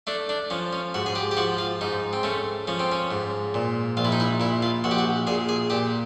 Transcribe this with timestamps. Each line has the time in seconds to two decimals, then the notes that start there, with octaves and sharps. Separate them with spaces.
0.07 A3 D4
0.29 D4
0.50 F3 C#4
0.73 C#4
0.94 G#2 F#4
1.06 G#4
1.15 G4
1.31 G4
1.37 F3 F#4
1.58 F4
1.81 G#2 D#4
2.13 C4
2.23 A3 C#4
2.67 F3 C#4
2.80 C4
2.92 C#4
3.11 G#2
3.54 A#2
3.97 A#1 F4
4.05 E4
4.12 D#4
4.20 E4
4.40 A#2 E4
4.62 F4
4.84 A#1 F#4
4.91 G4
4.98 F#4
5.27 A#2 G#4
5.49 G#4
5.70 A#2 G4